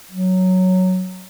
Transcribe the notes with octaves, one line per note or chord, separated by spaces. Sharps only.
F#3